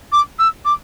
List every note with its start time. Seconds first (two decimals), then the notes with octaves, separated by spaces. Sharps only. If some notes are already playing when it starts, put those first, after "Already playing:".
0.12 D6
0.39 E6
0.65 D6